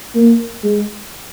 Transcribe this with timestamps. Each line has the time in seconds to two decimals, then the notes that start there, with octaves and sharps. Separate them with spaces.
0.15 A#3
0.64 G#3